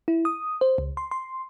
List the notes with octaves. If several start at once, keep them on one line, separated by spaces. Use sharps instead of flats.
E4
D#6
C5
C#2
C6
C6